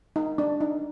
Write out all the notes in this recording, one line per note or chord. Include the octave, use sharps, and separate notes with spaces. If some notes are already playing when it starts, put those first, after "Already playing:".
D#4
D4
D#4